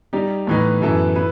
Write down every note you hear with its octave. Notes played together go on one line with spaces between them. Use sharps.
G3 D#4 G4
A2 E3 B3 D#4
F#2 E3 B3 E4 A4
B3 E4 B4